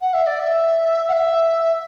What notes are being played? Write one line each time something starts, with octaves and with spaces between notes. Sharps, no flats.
F#5
E5
D5
E5
F#5
E5